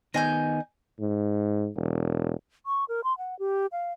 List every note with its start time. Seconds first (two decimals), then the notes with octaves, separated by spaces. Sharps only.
0.14 D#3 B3 D#5 G#5 G6
1.00 G#2
1.76 E1
2.66 C#6
2.89 A#4
3.04 C6
3.18 F#5
3.39 G4
3.72 F5